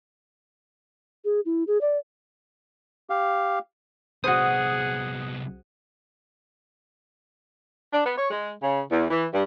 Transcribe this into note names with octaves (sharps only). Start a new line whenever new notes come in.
G#4
E4
G#4
D5
G4 F5
C2 B3 F#4 G#4 C5 F#5 D#6
D4
B3
C#5
G#3
C#3
E2
E3
G2